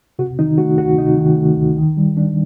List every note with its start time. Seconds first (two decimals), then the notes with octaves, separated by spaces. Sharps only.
0.19 C3 F#4
0.39 D#3 D#4
0.58 A3 F#4
0.78 D2 F#4
0.98 C3 D#4
1.18 D#3
1.37 A3
1.57 D2
1.77 D#3
1.97 G3
2.17 D4